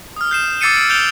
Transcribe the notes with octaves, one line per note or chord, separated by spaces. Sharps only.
D#6 F6
G6 C7 E7
D6 E6 A6 C7 C#7 D#7
E6 C#7 D7
F6 G6 D7 F7 G7